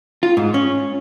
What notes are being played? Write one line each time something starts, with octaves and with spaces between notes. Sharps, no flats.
F4
G#2
C#4